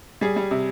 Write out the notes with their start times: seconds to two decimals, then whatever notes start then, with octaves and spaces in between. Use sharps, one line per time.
0.21 G3 G#4
0.36 G3
0.51 C3